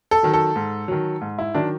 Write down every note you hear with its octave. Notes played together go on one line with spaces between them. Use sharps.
A4
D#3 F#3
A4
G#2
D#3 F#3
G#2
E4
D#3 F#3 D4